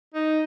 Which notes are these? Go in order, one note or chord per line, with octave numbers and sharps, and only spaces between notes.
D#4